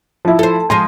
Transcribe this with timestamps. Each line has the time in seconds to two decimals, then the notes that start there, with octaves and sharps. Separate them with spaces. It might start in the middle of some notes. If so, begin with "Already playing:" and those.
0.25 F3 E4
0.39 A4 C5
0.70 F3 G#3 D#5 C6